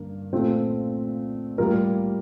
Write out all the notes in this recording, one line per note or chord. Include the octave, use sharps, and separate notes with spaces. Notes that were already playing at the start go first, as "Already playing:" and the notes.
Already playing: G2 D3 A#3
A#2 A3 C4 F4
A2 G3 A#3 F4 A#4